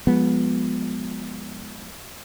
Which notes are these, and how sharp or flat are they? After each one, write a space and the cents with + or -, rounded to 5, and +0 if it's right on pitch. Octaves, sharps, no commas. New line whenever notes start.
F3 +30 G#3 +0 B3 +0